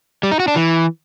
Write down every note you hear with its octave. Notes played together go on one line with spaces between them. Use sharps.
G3
D#4
F#4
D4
E3